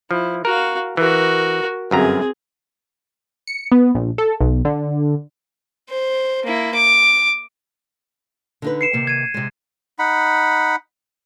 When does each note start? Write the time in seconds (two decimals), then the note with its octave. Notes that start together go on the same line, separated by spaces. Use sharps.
0.11 F3 E4
0.45 F#4 A#4 F5
0.97 E3 F#4 A#4
1.91 G1 F#2 C4 G#4 A#5
3.47 C#7
3.72 B3
3.95 A#1
4.18 A4
4.41 B1
4.65 D3
5.89 C5
6.44 A#3 E4
6.74 D6
8.62 D3 D#4 B4
8.81 C7 C#7 E7
8.93 C3 D#3 A#3
9.07 G#6 D#7
9.34 C3 G#3
9.99 D#4 F#5 B5